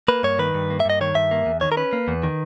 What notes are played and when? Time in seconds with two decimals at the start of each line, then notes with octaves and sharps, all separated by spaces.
0.08 A#3 B4
0.23 G2 C#5
0.39 D#3 B4
0.54 G2
0.70 A#3
0.80 E5
0.85 G2 D#5
1.01 D#3 C#5
1.15 G2 E5
1.31 A#3
1.46 E2
1.61 D#3 C#5
1.72 A#4
1.77 C#4 B4
1.93 A#3
2.08 E2
2.23 D#3